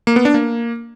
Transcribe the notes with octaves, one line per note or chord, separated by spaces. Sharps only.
A#3
B3
D4
A#3